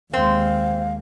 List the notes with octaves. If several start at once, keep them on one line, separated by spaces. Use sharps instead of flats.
D#2 G#3 C4 F5